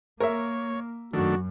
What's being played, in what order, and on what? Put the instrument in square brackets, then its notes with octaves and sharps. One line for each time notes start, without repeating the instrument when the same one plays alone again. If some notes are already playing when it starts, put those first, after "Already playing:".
[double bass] A#3 [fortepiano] A#4 E5 [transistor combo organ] C#5
[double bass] F#2 [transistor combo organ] D#3 A3 D4 [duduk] F#4